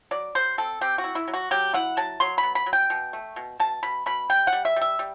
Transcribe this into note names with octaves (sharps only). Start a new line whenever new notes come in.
F#3 D5
F#3 C5
C4 A4
C4 G4
F#4
E4
E4
F#3
F#4
F#3 G4
E4 F#5
F#3 A5
F#3 C6
B5
B3
B5
F#3
G5
B2
A3
B2
B2 A5
B2 B5
B2 B5
G3 G5
F#5
G3
E5
G3
E5
G3